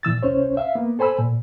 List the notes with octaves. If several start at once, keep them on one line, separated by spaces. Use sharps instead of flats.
A#2 E3 E6 A6
C2 C#4 C5 C#5
E5 F5
A#3 B3
A4 C5 G#5 B5 E6
A#2